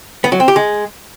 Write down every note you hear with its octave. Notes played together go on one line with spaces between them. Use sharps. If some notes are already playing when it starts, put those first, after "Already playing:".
B3
F#3
C4
G4
G#3